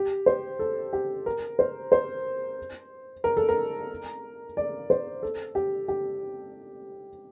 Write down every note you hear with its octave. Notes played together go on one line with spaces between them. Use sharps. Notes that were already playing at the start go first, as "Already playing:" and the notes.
Already playing: G4
C5
A4
G4
A#4
C5
C5
A#4
A4
A#4
D5
C5
A4
G4
G4